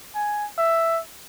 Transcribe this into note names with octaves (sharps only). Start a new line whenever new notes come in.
G#5
E5